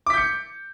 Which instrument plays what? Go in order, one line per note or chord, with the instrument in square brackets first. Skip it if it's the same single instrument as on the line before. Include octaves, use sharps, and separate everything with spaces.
[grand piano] D6
B6
G6
C#7